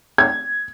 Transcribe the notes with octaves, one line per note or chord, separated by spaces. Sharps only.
G#6